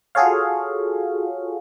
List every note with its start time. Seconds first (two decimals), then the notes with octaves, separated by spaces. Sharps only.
0.15 F4 F#4 G#4 A4 C#5 F5